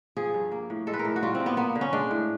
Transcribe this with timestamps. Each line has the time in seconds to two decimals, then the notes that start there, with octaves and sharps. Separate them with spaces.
0.17 F3 G#4
0.34 G2
0.52 A#3
0.70 A2
0.87 G#3 A4
0.93 B4
0.99 A#4
1.05 A2
1.16 F#4
1.23 G3 F4
1.35 C4
1.40 A#3
1.46 B3
1.57 A#3 B3
1.76 D3
1.81 C#4
1.93 G#3 D4
2.11 A2